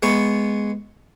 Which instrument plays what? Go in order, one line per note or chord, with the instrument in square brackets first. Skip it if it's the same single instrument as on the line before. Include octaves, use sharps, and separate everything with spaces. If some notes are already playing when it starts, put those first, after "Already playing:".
[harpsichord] G#3 B3 C#6